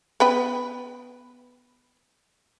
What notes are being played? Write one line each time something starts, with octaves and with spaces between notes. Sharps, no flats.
B3 B4 G5